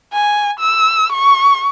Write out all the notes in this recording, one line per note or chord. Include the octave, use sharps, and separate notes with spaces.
G#5
E6
C#6